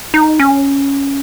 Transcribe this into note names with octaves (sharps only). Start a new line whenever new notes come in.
D#4
C#4